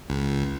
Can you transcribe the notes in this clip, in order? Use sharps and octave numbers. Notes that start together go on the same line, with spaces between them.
C#2